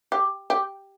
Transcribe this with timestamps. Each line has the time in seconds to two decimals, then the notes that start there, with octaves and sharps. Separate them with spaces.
0.12 G4
0.50 G4